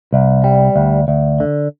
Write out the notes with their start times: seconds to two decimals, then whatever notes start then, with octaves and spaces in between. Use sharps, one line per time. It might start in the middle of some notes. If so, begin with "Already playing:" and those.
0.13 C2
0.44 G3
0.76 D2
1.08 D2
1.40 D3